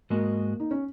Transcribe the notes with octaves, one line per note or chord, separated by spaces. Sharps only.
G#2 G#3 A#3 F#4 D#5
D#4
C#4